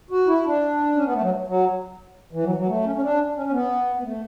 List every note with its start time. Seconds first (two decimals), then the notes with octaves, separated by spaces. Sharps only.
0.10 F#4
0.27 E4
0.45 D4
0.95 C#4
1.05 B3
1.13 A3
1.21 F#3
1.47 F#3
2.33 E3
2.43 F#3
2.55 F#3
2.67 A3
2.84 C#4
2.95 C#4
3.02 D4
3.36 C#4
3.46 C#4
3.52 B3
3.96 B3
4.03 A3